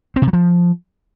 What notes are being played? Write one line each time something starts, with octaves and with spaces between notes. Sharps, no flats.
C4
C3
F#3
F3